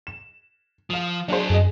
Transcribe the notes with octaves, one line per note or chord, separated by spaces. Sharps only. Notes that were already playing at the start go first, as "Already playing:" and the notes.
E7
F3 F5 D#6
F#3 D4 G#4 A4 C5
F#2 G#4 D#5